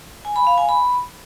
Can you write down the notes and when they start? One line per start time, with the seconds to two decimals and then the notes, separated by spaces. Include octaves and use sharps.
0.25 G#5
0.36 B5
0.47 F5
0.58 G#5
0.69 B5